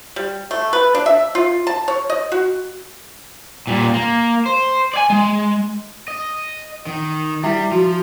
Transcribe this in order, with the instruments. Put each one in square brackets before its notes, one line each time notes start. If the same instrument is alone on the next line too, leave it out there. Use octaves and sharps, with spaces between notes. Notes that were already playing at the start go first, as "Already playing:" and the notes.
[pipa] G3
A3
B4
D4
E5
F4
A5
C#5
D#5
F#4
[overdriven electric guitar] A#2 G3
A#3
C5
D5 G#5
G#3
D#5
D#3
[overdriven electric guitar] G3 [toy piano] E4 E5 G5
[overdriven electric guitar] F3 [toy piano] F#4